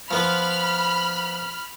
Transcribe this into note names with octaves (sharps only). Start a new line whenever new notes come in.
F3 B3 F4 B5 F6